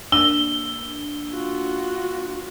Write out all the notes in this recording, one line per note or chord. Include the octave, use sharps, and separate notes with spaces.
A#3 D4 E6 G7
F4 F#4